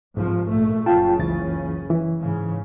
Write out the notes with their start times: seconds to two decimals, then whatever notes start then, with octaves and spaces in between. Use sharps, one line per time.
0.17 C2 G#2 F3
0.48 A#1 A#2 A3
0.86 F#1 C#3 C#4 F4 G5 A5
1.19 C#2 E3 A6
1.90 E3
2.19 G#2 C#3